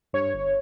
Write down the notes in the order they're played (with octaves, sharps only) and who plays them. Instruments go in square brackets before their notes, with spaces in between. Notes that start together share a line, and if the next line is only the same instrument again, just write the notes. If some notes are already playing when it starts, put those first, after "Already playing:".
[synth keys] G2 C#5
G1